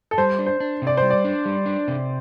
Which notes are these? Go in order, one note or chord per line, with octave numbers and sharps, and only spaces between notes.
A4
G3 C5
D4
C5
D4
C3 D5
G3 C5
D5
D4
G3
D4
C3